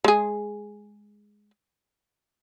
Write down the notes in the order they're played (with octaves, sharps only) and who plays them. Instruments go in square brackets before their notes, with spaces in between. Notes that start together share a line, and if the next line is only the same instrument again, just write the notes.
[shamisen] G#3 G#4